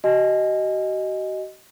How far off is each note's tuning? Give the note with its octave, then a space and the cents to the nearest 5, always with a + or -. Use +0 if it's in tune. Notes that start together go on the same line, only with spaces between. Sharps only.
F#4 +40 D#5 +0 G#5 +0